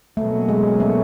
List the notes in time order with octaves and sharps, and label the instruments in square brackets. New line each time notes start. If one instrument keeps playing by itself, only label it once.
[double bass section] B2 F#3 A#3 C#4 [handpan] A3
[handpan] G#3
A3